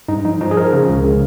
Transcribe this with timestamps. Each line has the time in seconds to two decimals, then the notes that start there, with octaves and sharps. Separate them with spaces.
0.08 G2 D#4
0.25 F3 D#4
0.41 F3 D#4
0.51 G#4
0.57 F3 A#4
0.73 C#3
0.89 C#2
1.04 C#3